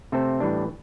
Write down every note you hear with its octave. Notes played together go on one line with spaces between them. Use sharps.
C3 A3 C4 A4 C5
A2 E3 G3 D4